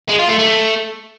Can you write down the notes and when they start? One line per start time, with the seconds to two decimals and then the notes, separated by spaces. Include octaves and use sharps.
0.08 G#3
0.19 F4
0.29 A3
0.39 A3